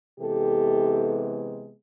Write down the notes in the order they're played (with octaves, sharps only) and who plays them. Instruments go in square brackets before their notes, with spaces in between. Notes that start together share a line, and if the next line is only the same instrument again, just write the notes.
[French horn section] C3 E3 G#3 B3 G4 A4